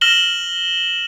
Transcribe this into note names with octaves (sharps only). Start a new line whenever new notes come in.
F6 A#6 E7 F#7 G7